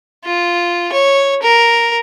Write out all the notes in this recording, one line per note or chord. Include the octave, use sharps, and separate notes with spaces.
F4
C#5
A#4